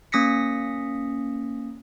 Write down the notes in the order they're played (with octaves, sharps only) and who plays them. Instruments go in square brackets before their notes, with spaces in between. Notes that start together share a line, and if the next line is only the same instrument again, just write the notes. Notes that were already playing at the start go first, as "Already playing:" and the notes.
[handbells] A#3 C#4 D#6 A#6 B6 C#7